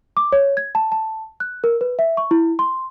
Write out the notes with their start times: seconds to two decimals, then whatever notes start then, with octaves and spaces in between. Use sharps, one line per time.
0.17 D6
0.32 C#5
0.57 G#6
0.75 A5
0.92 A5
1.40 F#6
1.64 A#4
1.81 B4
1.99 E5
2.17 C#6
2.31 E4
2.59 C6